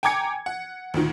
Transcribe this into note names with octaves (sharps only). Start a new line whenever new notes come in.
G5 G#5 A#5 D6 G#6 C#7
F#5
D2 A#2 D#3